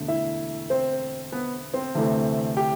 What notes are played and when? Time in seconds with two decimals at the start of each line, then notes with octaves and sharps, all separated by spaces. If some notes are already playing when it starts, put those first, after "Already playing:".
Already playing: E1 D2 D3
0.08 E4 E5
0.70 C4 C5
1.32 B3 B4
1.74 C4 C5
1.95 D2 C3 E3 A3
2.57 G4 G5